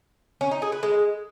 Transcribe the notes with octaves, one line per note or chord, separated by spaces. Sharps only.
C#4
D#4
G#4
B4
G#3